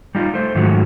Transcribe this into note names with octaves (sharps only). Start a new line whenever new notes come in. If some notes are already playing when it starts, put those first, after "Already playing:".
G3 D#4 F4
A3 C5
G#2 D#3 F3 F#3 A3 F#4